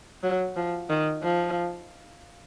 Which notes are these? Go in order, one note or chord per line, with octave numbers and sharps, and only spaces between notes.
F#3
F3
D#3
F3